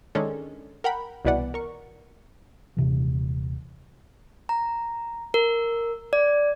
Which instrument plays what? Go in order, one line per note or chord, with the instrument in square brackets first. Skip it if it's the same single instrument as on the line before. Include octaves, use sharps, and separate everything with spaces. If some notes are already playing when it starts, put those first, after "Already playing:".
[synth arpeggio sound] D#3 G#3 C#4 D4 A4
A#4 F#5 G5 B5
C2 B2 E3 B4 D5 F#5
A#4 C#6
[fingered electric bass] D#1 C3 E3
[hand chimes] A#5
A#4
D5